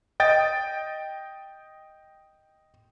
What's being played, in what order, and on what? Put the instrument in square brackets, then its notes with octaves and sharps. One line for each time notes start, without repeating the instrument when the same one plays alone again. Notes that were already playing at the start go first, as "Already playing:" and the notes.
[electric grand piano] D#5 G5 A6